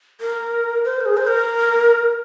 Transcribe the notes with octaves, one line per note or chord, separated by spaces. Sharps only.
A#4
C5
A#4
G#4
C5
A#4